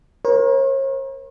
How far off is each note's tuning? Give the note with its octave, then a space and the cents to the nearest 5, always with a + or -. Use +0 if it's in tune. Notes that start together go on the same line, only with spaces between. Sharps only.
A#4 +30 C#5 -40